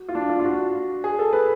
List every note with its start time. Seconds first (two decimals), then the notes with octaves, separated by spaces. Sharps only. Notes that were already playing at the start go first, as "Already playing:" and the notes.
Already playing: F#4
0.09 F4
0.15 D4
0.29 F4
0.40 F4
0.44 F#4
1.04 G#4
1.19 A4
1.33 B4